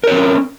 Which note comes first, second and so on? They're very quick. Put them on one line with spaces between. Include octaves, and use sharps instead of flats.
A#4 C#5 C4 C#4